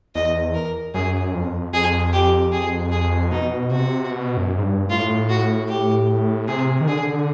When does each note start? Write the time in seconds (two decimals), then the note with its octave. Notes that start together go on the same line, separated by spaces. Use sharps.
0.15 E2 D#5
0.55 A#4
0.94 F#2 G#4
1.34 F2
1.73 F2 G#4
2.13 G4
2.52 G#4
2.92 G#4
3.32 B2 D#4
3.71 C3 F#4
4.11 B2
4.37 F#2
4.58 G#2
4.63 G2
4.90 A2 F4
5.29 F#4
5.69 G4
6.48 C3 G#4
6.81 D#3
6.88 D3 G#4